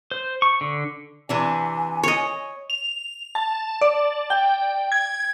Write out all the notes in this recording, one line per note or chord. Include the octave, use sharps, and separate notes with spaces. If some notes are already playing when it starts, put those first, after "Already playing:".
C5
C#6
D3
C3 E3 D4 G#5
C#5 D#5
F7
A5
D5
G5
G#6